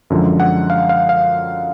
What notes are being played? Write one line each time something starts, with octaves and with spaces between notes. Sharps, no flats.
F#2 D3 F3 G#3
F#5
F5
F5
F5